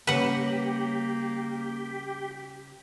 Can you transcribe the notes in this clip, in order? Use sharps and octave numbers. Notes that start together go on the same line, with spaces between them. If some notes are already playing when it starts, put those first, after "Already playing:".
C#3 G3 A#3 G4 B4 C#5 F#5